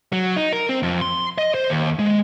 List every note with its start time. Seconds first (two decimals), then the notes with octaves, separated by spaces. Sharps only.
0.12 F#3
0.36 D#4
0.53 A#4
0.69 C4
0.83 F2
1.01 C6
1.38 D#5
1.54 C5
1.70 D#2
1.99 G#3